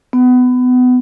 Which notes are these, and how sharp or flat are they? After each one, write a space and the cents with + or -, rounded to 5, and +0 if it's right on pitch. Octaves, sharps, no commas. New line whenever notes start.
B3 +25